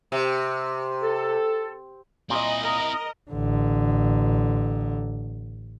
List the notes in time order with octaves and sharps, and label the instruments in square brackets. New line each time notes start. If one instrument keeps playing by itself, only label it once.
[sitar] C3
[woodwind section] A4
[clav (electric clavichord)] A#2 [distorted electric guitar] C4 E4 [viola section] D#5
[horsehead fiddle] A#4
[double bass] A1 D3